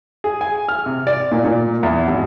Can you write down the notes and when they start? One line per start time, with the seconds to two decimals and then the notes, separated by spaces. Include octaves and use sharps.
0.24 G#4
0.41 G#5
0.69 F6
0.86 C3
1.07 D5
1.32 A#2
1.45 A#2
1.83 E2
2.08 G#1